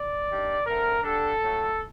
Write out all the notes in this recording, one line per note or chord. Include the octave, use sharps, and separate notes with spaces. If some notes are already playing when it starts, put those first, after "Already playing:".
Already playing: D5
D#3 G3 D4
D3 A3 C4 A#4
D3 G3 D4 A4
A2 F#3 A3